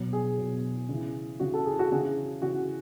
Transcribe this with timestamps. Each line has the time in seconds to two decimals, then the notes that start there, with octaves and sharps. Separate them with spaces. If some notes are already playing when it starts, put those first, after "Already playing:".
Already playing: B2 F#3
0.13 G#4
0.37 B2 F#3
0.89 C#3 E3
1.40 C#3 E3 F#4
1.54 A4
1.66 G#4
1.79 F#4
1.91 C#3 E3 G#4
2.42 C#3 E3 F#4